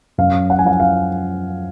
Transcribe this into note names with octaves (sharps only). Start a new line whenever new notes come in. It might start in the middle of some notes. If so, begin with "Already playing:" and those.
F#2 F5
F#5
G#5
F3 F#5
F5